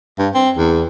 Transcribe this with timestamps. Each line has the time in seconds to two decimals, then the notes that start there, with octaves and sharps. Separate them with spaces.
0.19 G2
0.35 C4
0.57 E2